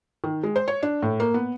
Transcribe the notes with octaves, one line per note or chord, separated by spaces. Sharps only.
D#3
G#3
C5
C#5
D4
A2
A#3
B3